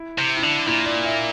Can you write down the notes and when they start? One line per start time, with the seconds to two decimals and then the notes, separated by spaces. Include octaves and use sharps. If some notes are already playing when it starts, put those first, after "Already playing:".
Already playing: E4
0.18 C3
0.37 E4
0.42 D3 D4
0.67 A#2 E4
0.86 D5
1.05 E5